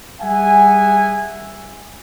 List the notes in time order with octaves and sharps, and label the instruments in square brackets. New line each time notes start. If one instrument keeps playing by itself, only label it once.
[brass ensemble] G3 G#4 E5 F#5 G#5